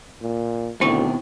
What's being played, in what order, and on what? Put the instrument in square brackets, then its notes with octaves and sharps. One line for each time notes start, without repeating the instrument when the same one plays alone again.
[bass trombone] A#2
[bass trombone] D2 [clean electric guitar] B2 D#3 C4 [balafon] E4 G5 C#6